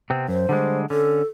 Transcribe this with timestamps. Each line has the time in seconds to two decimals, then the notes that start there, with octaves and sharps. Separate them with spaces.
0.10 C3 B3 C4
0.28 F#2 C5
0.49 D3 G3 G#3
0.90 D3 C#4 A4